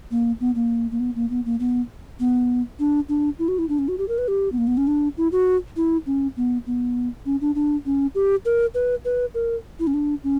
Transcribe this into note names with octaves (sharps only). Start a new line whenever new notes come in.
A#3
B3
A#3
A#3
B3
A#3
B3
A#3
B3
B3
D4
D4
E4
F#4
E4
D4
C#4
F#4
G4
A#4
B4
G4
B3
A#3
B3
C#4
D4
E4
F#4
E4
C#4
B3
B3
C#4
D4
D4
C#4
G4
A#4
B4
B4
A#4
E4
C#4
D4
C#4